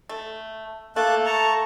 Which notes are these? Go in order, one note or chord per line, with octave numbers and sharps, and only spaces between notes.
A3
A3 A#3 A4 A5 F#6
A5 A#5 C#6